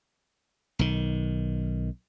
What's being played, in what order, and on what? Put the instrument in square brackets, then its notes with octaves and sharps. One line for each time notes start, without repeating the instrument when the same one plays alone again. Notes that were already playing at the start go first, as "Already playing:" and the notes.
[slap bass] B1 D#3